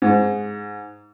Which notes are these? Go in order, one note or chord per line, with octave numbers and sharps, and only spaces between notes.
G#2